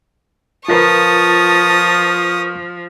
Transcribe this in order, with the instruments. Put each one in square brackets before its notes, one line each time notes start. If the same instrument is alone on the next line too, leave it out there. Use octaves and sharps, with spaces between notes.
[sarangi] F3 [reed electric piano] F4 A#4 B4 [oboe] A5 [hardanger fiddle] C#6 D#6